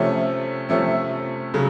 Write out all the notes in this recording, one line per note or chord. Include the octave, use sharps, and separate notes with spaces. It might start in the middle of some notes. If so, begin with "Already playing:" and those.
Already playing: C3 F3 A3 C#4
C3 F3 A3 C#4
C#3 F#3